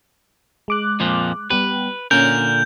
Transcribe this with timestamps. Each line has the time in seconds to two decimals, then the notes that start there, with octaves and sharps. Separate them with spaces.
0.68 G#3 D6 F#6
1.00 F2 A#2 F3
1.50 G3 B3 G4 B4
2.11 A#2 D3 C#4 A#4 G6